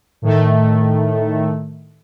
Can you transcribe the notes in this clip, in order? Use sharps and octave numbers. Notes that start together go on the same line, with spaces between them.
A2 D#3 A3